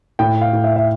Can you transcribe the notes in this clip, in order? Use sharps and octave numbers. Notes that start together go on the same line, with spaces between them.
A2 G5
F5
A2
E5
E5